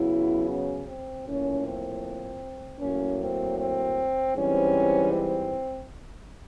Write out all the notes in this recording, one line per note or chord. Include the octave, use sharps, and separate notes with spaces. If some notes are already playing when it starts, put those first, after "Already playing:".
Already playing: C#3 F#3 B3 E4
C#4
C4
A2 F3 A#3 C#4
C4
A2 F#3 A#3 C#4
C4
C4
G#2 E3 G3 C4 C#4
C4